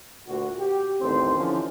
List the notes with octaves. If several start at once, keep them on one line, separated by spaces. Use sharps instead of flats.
D2 A#2 F#4
G4
A1 D#2 D3 C4 C5
D3 E3 F3 C#4 D#4